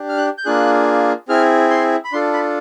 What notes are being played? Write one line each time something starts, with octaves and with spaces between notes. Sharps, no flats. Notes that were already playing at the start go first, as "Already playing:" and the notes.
Already playing: D4 G4
F6
F#6
G6
A#3 D4 F4 G#4 F#6
C4 E4 G#4 F6
C6
B5
D4 F4 A4 C6
B5